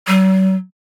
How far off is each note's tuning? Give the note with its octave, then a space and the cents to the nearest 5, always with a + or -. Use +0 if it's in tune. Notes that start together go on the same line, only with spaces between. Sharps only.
F#3 +45